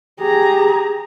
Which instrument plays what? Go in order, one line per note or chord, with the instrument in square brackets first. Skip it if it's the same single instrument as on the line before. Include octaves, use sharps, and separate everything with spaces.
[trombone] G4 [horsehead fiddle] G#4 A#5